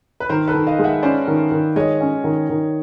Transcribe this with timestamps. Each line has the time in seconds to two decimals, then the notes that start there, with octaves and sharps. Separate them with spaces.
0.20 B4
0.29 D#3 A#4 C5
0.48 A4 B4
0.54 D#3
0.67 D#5 F5
0.79 G#3
0.84 E5 F#5
1.03 C#4 C5 D5
1.27 D#3
1.51 D#3
1.76 G#3 C#5 D#5
2.01 C#4
2.24 D#3
2.49 D#3